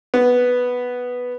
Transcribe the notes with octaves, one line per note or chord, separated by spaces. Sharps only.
B3